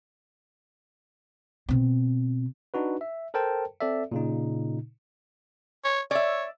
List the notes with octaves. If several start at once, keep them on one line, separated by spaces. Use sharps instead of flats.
B2 C4
D4 D#4 F#4 B4
E5
A4 A#4 C5 G5 A5
C4 A4 D5 E5
A#2 C#3 D#4
C#5
C#5 D5 E5